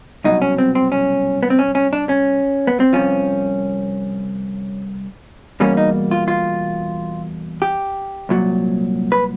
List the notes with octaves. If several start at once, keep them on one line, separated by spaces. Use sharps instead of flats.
C2 B2 F#3 D#4
C#4
C4
C4
C#4
B3
C4
C#4
C#4
D4
C#4
B3
C4
C2 C3 F3 C#4
E2 B2 G3 A#3 C#4
D#4
F4
F4
G4
C2 A#2 F#3
B4